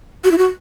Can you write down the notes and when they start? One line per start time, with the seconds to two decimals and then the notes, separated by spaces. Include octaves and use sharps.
0.24 F#4
0.32 E4
0.38 F#4